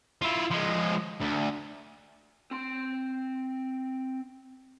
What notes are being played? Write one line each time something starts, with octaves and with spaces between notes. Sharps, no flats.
E4 F4
F3 G#3
D2
C4 C6